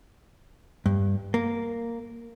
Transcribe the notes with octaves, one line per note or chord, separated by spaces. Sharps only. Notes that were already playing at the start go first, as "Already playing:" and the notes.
G2
A#3